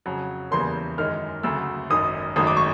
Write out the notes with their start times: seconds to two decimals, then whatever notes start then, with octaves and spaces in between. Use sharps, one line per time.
0.06 F2 C#3 F#3
0.51 E2 C#3 E3 G3 A#3 C6
0.98 F#2 D#3 G#3 F6
1.43 D2 C#3 F#3 A3 E6
1.90 G#1 F#2 D#3 D#6
2.36 G#1 F#2 D#3 F#3 A3 D#6
2.47 D6
2.57 C#6